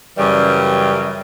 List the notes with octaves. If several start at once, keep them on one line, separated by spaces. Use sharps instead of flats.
F#2 C#3 E3 G3